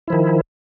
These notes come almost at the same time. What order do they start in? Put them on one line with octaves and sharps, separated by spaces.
E4 F3 D#3